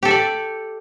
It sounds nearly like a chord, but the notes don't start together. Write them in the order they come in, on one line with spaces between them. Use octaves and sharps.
G4 A4 E5 D5